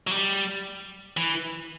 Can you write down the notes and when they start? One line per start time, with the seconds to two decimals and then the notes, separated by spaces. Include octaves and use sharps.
0.07 F#3
0.11 G3
1.17 E3